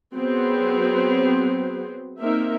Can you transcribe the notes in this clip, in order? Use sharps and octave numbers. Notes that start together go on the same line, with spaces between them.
F#3 B3 C4 G#4 C5
A#3 C4 D#4 A#4 E5